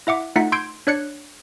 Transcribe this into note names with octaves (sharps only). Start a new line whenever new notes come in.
E4 E5 F#5 D6
A3 D#4 F4 F#5 B6
C6 E6 G6 G#6 D7
D4 C#5 D5 F#6 G#6 C#7